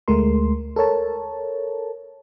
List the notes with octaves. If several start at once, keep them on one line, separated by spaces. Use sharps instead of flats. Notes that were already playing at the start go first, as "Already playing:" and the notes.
D2 G#3 A3 A#4 C6
A4 A#4 C#5 A5